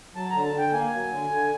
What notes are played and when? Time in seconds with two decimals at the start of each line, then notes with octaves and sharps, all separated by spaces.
0.15 F#3 A5
0.29 D3 A#5
0.44 A5
0.54 D3 G5
0.72 A#3 G#5
0.91 F#3
1.10 D3
1.30 D3